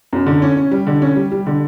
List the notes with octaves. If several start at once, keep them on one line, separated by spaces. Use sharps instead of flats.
F#2
D3
C#4
C#4
G3
D3
C#4
G3
G3
D3